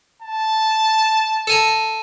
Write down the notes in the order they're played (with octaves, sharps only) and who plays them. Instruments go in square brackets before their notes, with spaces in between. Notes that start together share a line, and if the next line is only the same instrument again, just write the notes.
[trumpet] A5
[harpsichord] A4 G#5 A#5